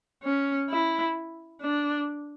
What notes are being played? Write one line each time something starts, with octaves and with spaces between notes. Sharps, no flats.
C#4
E4
D4